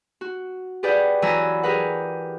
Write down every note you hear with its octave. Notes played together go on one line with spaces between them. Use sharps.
F#4
G4 G#4 B4 D5 F#5 G5
E3 F#3 G#5 A#5 B5 E6
G4 G#4 A#4 B4 F#5